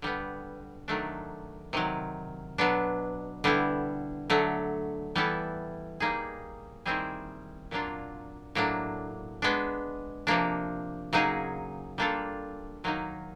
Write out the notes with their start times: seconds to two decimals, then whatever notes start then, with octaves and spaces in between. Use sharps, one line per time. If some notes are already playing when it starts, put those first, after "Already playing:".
0.02 D3 G3 B3
0.88 D#3 F#3 A3 D4
1.73 C3 D#3 F#3
2.58 B2 F#3 B3 D4
3.44 D3 G3 B3 E4
4.30 D3 F#3 A3
5.15 E3 G3 B3 E4 A4
6.00 G3 A#3 D#4 G#4
6.85 D#3 G3 C4 E4 G#4
7.71 A#2 F#3 A#3 D4 F4
8.55 A2 F#3 A#3 D4
9.42 G#3 B3 D4
10.27 C3 F3 A#3 D4
11.13 C#3 F#3 A#3 D#4 G#4
11.98 G3 A#3 D4 F4 A4
12.84 D#3 F#3 A#3 D#4